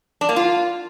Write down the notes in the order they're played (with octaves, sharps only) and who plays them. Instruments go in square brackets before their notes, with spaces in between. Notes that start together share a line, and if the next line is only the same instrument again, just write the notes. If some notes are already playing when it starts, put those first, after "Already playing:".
[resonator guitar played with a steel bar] D4
A#3
F4